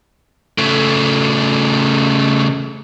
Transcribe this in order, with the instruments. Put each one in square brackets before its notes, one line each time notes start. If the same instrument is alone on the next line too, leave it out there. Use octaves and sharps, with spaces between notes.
[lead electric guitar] C#3 A3